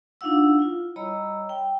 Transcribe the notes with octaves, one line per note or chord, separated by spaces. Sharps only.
D4 D#4 F4 F5 F#5 E6
E4 F4
G3 C#5 D#5 A#5 B5 E6
G5